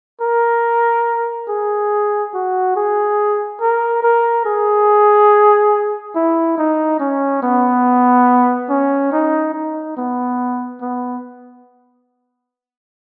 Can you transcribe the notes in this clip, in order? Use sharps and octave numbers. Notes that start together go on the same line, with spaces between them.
A#4
G#4
F#4
G#4
A#4
A#4
G#4
E4
D#4
C#4
B3
C#4
D#4
D#4
B3
B3